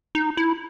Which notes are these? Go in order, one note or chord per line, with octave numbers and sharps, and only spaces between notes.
D#4
E4